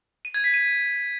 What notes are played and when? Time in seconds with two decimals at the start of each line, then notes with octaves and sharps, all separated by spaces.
0.25 D#7
0.34 G#6
0.44 B6
0.54 D#7